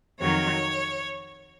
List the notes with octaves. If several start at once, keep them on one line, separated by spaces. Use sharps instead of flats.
F2 D#3 F#3 C#5